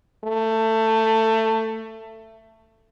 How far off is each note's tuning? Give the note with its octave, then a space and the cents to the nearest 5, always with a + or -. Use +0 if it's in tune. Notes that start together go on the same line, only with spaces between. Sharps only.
A3 +20